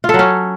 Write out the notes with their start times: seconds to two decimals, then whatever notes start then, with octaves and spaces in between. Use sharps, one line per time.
0.04 F4
0.09 A4
0.14 F#3
0.19 C#4